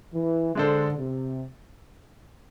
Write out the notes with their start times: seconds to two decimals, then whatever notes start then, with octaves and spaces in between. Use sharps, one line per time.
0.14 E3
0.55 D3 G#3 D4 A4 C5
0.98 C3